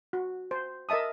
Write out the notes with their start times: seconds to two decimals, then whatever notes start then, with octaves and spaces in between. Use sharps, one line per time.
0.13 F#4
0.51 C5
0.89 A#4 D#5 E5 A5 D#6